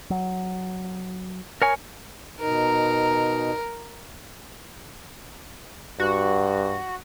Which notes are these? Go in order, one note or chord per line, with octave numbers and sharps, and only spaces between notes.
F#3
A#4 C#5 G#5
B2 D#4 A#4
G2 F#4